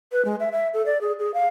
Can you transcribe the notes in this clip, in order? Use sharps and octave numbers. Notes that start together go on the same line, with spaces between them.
B4
G#3
E5
E5
A4
D5
G#4
G#4
F5